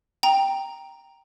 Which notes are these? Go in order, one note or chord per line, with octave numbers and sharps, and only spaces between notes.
G5 A#5